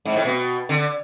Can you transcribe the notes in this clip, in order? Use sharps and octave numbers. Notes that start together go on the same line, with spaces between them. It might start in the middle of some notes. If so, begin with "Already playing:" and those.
G#2
A2
B2
D3